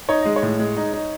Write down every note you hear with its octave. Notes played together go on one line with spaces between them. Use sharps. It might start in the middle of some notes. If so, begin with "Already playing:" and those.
D#4 C#5
G#3 D#5
C#5
A2
G#3
D#4
D#4